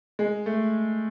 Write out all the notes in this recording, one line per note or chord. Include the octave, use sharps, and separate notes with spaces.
G#3
A3